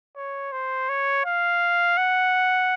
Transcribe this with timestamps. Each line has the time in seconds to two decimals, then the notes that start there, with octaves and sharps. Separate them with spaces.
0.16 C#5
0.52 C5
0.89 C#5
1.25 F5
1.97 F#5